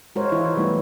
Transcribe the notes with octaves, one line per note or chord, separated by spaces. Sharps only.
G#3 F#4 A#4 C5 C#5
E3 E4 F4 C#5
F#3 G3 A3 B3 D#4 E4